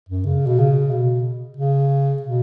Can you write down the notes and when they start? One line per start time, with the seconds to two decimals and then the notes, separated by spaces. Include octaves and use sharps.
0.09 F#2
0.26 C#3
0.46 B2
0.59 C#3
0.91 B2
1.57 C#3
2.22 B2